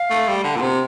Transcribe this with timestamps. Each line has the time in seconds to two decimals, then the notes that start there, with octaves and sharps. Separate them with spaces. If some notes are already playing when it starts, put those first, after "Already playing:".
Already playing: F5
0.10 A3
0.28 G3
0.44 D3
0.56 A#2
0.62 C3